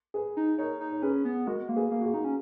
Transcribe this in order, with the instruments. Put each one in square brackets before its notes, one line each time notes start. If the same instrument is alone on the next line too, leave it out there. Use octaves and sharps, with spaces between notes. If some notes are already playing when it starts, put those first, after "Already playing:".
[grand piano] G#4 B4
[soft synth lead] D#4
[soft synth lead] D#4 [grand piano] A#4 C#5
[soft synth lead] D#4
[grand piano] C#5
[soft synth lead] C#4 [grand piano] G#4 B4
[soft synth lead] B3
[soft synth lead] G#3 [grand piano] F#4 A#4
[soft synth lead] A#3
[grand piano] G#4 B4
[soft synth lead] A#3
[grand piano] F#4
F4 G#4
[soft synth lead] D#4
C#4